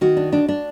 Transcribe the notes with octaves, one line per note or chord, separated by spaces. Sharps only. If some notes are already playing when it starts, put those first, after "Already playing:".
D#3 F#4
D4
D4
D4